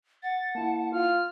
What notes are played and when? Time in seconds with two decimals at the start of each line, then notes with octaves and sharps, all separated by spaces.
0.23 F#5 A6
0.55 A#3 E4 A5
0.92 F4 F6